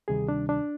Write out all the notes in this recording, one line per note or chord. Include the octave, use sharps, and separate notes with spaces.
D2 C3 D#3 G3 G#4
D4
D4